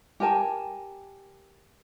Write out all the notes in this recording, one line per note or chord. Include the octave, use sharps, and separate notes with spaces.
G4 A#4 G#5 A5